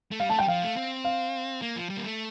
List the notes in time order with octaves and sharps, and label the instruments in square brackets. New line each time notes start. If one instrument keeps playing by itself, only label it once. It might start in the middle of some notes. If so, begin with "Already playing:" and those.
[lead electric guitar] A3
[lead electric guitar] G3 [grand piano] F5
[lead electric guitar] A3 [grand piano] A5
[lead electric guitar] G3 [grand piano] G5
[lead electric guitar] F3 [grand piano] F5
[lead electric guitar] A3
C4
[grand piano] F5
[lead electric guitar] A#3
F3
G3
A#3
A3